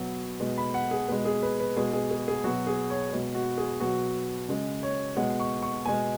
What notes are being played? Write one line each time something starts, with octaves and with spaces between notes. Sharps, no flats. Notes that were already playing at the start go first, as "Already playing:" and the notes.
Already playing: B2 F#3
B2 G#3
B5
F#5
G#4
B2 G#3 B4
G#4
B4
B4
B2 G#3 G#4
G#4
G#4
G#4
B2 F#3 F#4
G#4
C#5
B2 G#3
F#4
G#4
B2 F#3 F#4
C#3 G#3
C#5
B2 G#3 F#5
C#6
C#6
B2 G#3 G#5